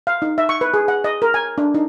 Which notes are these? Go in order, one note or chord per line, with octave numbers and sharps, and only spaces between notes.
F5
D#4
E5
C#6
B4
G#4
F#5
D#5
A#4
G#5
D4
D#4